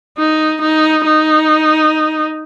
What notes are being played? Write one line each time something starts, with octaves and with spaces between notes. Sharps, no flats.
D#4
D#4
D#4